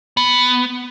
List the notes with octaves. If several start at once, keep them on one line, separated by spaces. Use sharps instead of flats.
B3